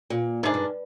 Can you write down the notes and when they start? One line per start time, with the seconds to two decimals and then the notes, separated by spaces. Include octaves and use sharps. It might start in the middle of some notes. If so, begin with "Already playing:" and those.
0.10 A#2
0.43 G#2 D#3 G#3 D4
0.54 G2